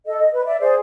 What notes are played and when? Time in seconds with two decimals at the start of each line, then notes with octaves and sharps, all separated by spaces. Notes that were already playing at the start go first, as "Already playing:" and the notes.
0.06 A4 D#5
0.19 D#5
0.32 B4
0.45 D5 E5
0.60 G#4 C5 D5